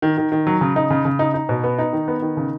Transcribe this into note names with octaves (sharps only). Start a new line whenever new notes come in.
D#3
D#3
D#3
F#3
C#3
D#4
C#3
C#3
D#4
D#4
B2
B3
D#4
D#3
B3
D#3
C#3